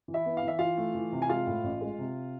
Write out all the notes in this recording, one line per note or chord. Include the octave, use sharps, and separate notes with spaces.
E3
E4 E5
B3
F5
E3
E5
E3 F4 F5
A3
E3
C3
G#5
G#3 F4 F5
A2
A1
G#3
C3